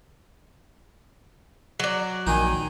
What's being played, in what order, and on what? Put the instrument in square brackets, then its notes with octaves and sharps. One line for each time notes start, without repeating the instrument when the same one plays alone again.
[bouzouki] F#3 D5
[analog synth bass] A#1 [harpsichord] D#3 D#4 [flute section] G#5